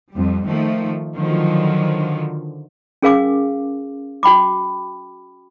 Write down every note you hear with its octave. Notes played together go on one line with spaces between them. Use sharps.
F2 G3
D#3 F3 A3
D3 D#3 F3 F#3
C#4 G#4 A#4 F5 G#5 D6
F#4 G5 B5 D6